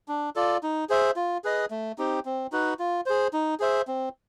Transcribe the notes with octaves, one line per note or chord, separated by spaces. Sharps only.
D4
F4 A4 D5
D#4
G#4 C5 E5
F4
G#4 B4 D#5
A3
C4 D#4 G4
C4
D#4 F#4 B4
F4
G#4 C5
D#4
G#4 C5 E5
C4